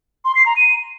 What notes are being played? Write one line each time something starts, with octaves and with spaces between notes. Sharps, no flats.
C6
C7
A#5
D#7